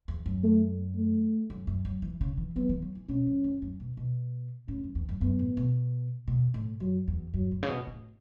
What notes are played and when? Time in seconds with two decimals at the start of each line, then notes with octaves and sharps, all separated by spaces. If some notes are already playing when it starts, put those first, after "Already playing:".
0.08 E2
0.26 F#2
0.43 A3
0.96 A3
1.50 F#2
1.67 F#2
1.85 F#3
2.02 E3
2.21 C#3
2.37 E3
2.56 F#3 B3
2.69 E3
2.82 F#3
2.95 E3
3.09 B2 C#4
3.27 F#2
3.44 E2
3.62 F#2
3.80 B2
3.97 B2
4.68 A2 C#4
4.84 F#2
4.95 E2
5.09 F#2
5.21 F#2 B3
5.39 A2
5.57 B2
6.28 B2
6.54 A2
6.80 F#2 F#3
7.08 E2
7.34 F#2 F#3
7.51 A2
7.63 C#3
7.69 B2
7.87 A2